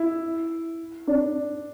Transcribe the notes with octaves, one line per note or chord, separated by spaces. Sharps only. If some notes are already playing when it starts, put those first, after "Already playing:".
Already playing: E4
D4